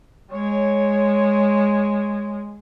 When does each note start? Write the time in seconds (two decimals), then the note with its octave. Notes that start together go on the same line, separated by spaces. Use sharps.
0.32 G#3 C#5